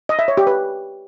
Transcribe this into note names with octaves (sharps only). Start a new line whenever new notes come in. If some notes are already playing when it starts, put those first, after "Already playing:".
D#5
E5
C#5
G4
B4